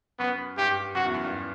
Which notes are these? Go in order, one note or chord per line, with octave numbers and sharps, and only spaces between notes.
F#2 B3
G2 G4
F#2 F#4
E2
F#2
G2